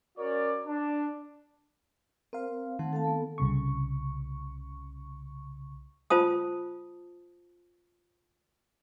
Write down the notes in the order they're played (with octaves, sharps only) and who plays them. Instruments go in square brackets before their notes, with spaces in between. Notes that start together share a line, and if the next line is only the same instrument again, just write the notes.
[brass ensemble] C#4 F#4 A#4 C#5 D5
D4
[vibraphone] C4 C5 [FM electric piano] A#4 F5
[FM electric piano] D#3 [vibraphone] A3 C4 F#5
[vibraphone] A4 F5 A5
B3 A4
[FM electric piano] C2 C#3 C#6
[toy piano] F4 C5 A5 D#6